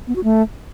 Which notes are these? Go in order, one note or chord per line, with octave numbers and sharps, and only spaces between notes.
B3
F#4
A3